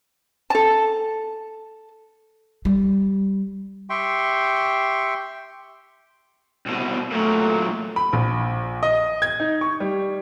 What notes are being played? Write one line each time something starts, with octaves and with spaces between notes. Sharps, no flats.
A4 A5
G3
G4 E5 G5 C6 C#6
C2 B2
A#2 F#3 A3
B5
A#1
D#5
G#6
D#4
C#6
G3